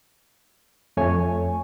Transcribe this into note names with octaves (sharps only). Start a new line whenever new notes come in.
F2 A3 C#5 G#5